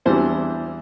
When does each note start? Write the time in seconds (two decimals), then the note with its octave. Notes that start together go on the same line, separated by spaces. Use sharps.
0.05 E2 E3 G3 C4 D4 C5